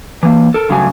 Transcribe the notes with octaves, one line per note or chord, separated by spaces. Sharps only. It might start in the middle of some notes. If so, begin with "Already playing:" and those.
E3 A#3
A4 A#4
G2 C#3 F#3 A3 G#5